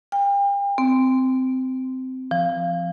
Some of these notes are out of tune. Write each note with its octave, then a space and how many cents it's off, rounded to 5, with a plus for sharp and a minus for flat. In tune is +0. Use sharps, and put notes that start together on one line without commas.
G5 +40
C4 -15
F3 -20